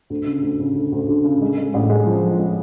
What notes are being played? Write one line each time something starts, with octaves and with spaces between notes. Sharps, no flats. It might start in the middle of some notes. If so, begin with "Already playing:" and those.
D2
C#3
D2
C#3
D2
D2
D2
C#3
G#3
G#3
A1
G#3
F3
F3
G#3